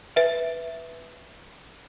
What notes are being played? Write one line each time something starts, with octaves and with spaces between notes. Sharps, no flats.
B4 E5